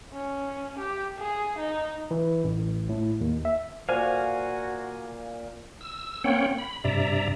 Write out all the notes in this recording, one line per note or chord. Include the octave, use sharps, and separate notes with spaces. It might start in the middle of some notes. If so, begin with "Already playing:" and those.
C#4
G4
G#4
D#4
E3
A1
A2
D#2
E5
A#2 F#4 C5 F5 G#5
E6
A#3 C4 C#4 C#5 F#5 G5
B5
G2 C3 D5 E5 A#5